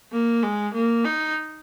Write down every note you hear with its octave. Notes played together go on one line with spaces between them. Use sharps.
A#3
G#3
A#3
D#4